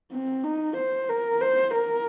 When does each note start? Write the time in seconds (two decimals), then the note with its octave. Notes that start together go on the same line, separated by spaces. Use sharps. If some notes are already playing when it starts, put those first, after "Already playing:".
0.12 C4
0.44 D#4
0.77 C5
1.09 A#4
1.41 C5
1.75 A#4